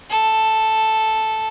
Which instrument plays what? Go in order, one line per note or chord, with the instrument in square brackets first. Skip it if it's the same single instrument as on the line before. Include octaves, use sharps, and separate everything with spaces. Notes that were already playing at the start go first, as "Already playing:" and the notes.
[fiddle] A4